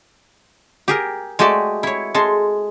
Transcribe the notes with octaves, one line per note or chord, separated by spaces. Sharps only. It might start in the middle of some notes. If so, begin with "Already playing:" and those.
G4 G#4 A#4
G#3 A3 F#4 G4 A4 D5
E4 C#5
G#3 A4 C6